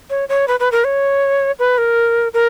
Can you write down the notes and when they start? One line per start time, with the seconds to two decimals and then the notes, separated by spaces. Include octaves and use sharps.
0.10 C#5
0.29 C#5
0.48 B4
0.60 B4
0.72 A#4
0.84 C#5
1.59 B4
1.78 A#4
2.34 A#4